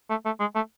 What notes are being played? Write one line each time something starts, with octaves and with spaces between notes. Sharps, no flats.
A3
A3
G#3
A3